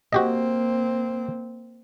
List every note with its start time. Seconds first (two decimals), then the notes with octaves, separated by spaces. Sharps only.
0.13 A#3 C4 F#4 G4 D#5